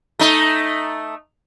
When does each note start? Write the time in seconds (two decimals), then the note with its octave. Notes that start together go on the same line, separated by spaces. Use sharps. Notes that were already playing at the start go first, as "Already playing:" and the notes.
0.19 A3 D#4